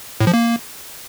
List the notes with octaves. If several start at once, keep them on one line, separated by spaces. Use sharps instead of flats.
A2
F3
A#3